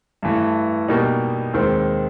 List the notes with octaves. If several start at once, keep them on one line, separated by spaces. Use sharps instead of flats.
G2 E3 A3
B2 G3 A#3 D#4
D#2 D#3 G#3 C4